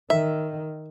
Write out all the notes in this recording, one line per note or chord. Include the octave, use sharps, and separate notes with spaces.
D#3 E5